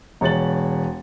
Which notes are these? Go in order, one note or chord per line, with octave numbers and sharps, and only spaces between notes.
E1 C#5 A6 F#7